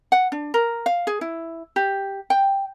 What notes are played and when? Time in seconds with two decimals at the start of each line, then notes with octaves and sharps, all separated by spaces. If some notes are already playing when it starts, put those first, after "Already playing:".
0.12 F#5
0.32 D4
0.54 A#4
0.86 F5
1.07 G#4
1.21 E4
1.76 G4
2.30 G5